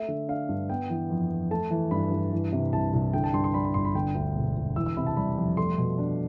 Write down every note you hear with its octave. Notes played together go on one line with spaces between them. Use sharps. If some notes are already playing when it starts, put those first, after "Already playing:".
Already playing: A3 E5
D3
D4 F5
G2
B3 G5
E3
F2
F2
A3 A5
E3
G2 B5
G2
E3
C3
C2 A5
C2
D3 G5
A5
G2 C6
C6
G3 B5
B5
G1 C6
B5
D3 G5
D2
E1
E1
E3 E6
E6
C3 B5
A5
G3 B5
F2
A3 C6
B2
D4